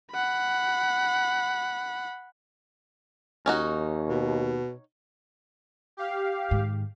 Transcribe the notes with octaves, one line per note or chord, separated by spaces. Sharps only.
F#5 B5
D#2 C#4 D#4 F#4
B2
G4 F5
G#2 D#3